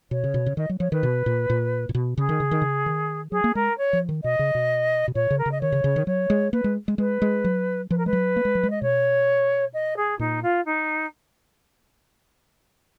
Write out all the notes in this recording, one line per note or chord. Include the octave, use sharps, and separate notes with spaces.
B2 C#5
C#3
B2
C#3
D#3 D#5
F#3
F3 C#5
D#3 B4
B2
A#2
A#2
A#2
B2
C#3 G#4
D#3
C#3
D#3
C#3
D#3
F#3 G#4
A#3
G#3 A#4
C#5
F3
D#3
B2 D#5
C#3
B2
B2
A#2 C#5
C#3
A#4
C#3
D#5
D#3 C#5
C#3
C#3
D#3
F#3 C#5
G#3
A#3 B4
G#3
G#3
G#3 B4
G#3
F#3
F3 B4
A#4
G#3 B4
F#3
A#3
G#3
F#3
G#3
D#5
B2 C#5
D#5
G#4
A#2 D#4
F4
D#4